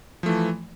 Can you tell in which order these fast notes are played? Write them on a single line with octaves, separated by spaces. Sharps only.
F3 A3 E3